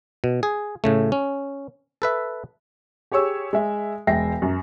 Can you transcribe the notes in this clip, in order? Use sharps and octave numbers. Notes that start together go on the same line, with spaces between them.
B2
G#4
A2 C#3 A3
C#4
A4 B4 E5
G4 G#4 C#5 C#6 E6
G#3 E5
E1 G#3 E5 G5 A#6 C7
F#2